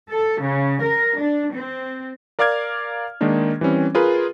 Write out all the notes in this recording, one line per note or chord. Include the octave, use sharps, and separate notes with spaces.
A4
C#3
A#4
D4
C4
A#4 D5 F5 D6 F6 G#6
D#3 G#3 A#3 D4 D#4
E3 G3 C4 C#4
F4 G#4 A#4 B4